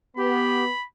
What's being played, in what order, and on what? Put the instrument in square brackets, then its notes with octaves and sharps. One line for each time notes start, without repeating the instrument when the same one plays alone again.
[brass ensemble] B3 [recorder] G4 [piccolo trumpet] B5